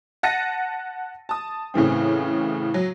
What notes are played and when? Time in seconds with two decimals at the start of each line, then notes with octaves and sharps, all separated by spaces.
0.23 F#5 A5 A6 A#6 C#7 D#7
1.29 A5 D#6
1.74 A2 C#3 E3 C4
2.74 F#3